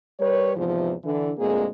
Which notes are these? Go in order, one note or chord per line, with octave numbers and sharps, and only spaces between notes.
G3 A#4 B4 C#5
E2 G#2 C3 E3 F3
D3 E3 D4
D2 A#2 G#3 A#3 C4 G#4